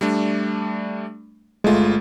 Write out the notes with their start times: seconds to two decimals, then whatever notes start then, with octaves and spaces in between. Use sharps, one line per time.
0.01 G3 A3 D4
1.64 G1 G#3 A3 F4